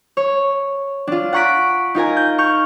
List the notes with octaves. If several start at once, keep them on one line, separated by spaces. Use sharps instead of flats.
C#5
D4 F4
F#5 A#5 C#6 F#6 B6 D7
D#4 F4 A#4 G#5
G6
C#6 F6 G6